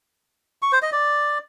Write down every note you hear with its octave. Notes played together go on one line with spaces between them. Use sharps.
C#6
C5
D#5
D5